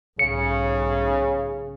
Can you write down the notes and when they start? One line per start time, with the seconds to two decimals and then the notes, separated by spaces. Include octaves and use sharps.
0.19 B1 G#2 C#3 C#7